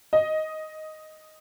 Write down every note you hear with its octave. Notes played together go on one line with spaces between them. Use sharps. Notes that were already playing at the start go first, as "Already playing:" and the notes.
D#5